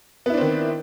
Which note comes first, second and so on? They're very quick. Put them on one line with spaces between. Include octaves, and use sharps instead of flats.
B3 E4 D4 C4 D#3